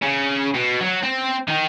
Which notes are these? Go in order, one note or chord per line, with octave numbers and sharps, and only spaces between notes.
C#3
B2
F#3
C4
D#3